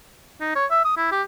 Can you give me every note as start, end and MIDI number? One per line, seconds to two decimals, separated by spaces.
0.41 0.52 63
0.55 0.66 73
0.71 0.82 76
0.85 0.97 87
0.97 1.09 64
1.12 1.22 67